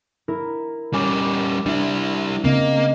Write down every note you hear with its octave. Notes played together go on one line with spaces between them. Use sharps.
E4 A#4
G3 C#4 G#5 D6
G3 D4 E4
C#3 A#3 C4 D#5 F5